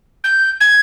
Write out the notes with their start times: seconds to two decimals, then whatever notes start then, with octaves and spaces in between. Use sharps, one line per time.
0.24 G6
0.60 G#6